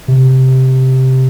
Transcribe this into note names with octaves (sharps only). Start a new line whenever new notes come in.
C3